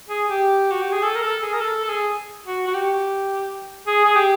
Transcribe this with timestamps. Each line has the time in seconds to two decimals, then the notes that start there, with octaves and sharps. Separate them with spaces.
0.09 G#4
0.28 G4
0.71 F#4
0.82 G4
0.92 G#4
1.03 A4
1.15 A#4
1.23 A4
1.42 G#4
1.53 A#4
1.61 A4
1.84 A4
1.89 G#4
2.46 F#4
2.67 F#4
2.75 G4
3.87 G#4
4.05 G#4
4.16 G4